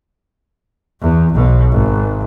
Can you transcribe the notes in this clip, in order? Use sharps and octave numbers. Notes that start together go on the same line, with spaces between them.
E2
B1 B2
G#1